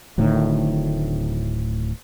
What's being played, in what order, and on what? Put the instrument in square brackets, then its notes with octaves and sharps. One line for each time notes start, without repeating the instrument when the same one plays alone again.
[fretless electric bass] D1 D2 A2 D#3